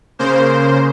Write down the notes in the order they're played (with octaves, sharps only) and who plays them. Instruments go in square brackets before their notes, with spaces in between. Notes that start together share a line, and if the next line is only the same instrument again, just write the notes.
[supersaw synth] C#3 A#3 C5